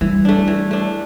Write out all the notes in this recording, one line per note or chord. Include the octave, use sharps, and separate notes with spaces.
E3 G3
A3 D4
E3
A3 D4